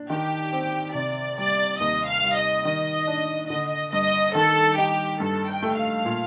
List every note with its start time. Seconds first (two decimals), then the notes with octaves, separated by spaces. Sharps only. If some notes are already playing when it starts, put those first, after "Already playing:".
Already playing: D4
0.10 D#3 G4
0.52 C4
0.95 C3 D5
1.37 G3 D5
1.80 D#2 D#5
2.08 F5
2.23 G3
2.36 D#5
2.65 D#3 D#5
3.07 D4
3.50 D3 D#5
3.93 G2 D#5
4.35 D#3 A4
4.77 D#4 G4
5.20 G2 A4
5.49 G5
5.62 A3
5.77 F5
6.05 A#2